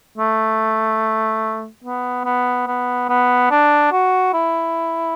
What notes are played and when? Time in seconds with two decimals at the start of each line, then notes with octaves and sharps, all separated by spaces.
0.18 A3
1.84 B3
2.25 B3
2.67 B3
3.09 B3
3.51 D4
3.92 F#4
4.34 E4